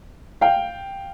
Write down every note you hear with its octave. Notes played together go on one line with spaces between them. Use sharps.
F5 G5